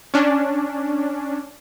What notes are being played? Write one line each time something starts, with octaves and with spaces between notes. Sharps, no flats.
C#4 D4